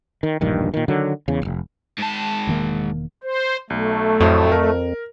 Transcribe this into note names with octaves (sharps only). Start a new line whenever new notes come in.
D#3
E1 A#1 G2 D#3
A#2 D#3
D3 D#3 F#3
E2 C#3
F1 C#2
G#2 A5
E1 D#3 A#3
C5
B1 A3
F2 A2 F#3 C5
A#4